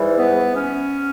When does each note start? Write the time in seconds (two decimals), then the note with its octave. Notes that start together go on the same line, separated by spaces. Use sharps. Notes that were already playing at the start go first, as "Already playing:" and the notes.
Already playing: G#2 E3 G3
0.18 B3
0.55 C#4